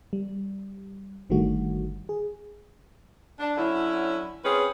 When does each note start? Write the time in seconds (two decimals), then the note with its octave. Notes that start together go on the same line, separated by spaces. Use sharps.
0.13 G3
1.30 G1 D3 D#3 G3 A3 F#4
2.09 G#4
3.39 D4
3.58 D3 F#3 C#4 E4
4.44 C4 C#4 F4 G#4 B4